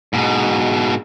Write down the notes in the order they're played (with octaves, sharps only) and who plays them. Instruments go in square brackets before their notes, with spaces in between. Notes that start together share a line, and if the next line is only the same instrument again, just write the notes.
[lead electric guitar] G#2 B2